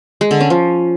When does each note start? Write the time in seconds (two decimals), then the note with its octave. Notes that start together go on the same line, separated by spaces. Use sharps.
0.21 G#3
0.31 D3
0.40 C#4
0.50 F3